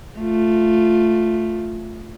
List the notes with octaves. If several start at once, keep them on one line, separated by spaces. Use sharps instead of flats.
A3 F4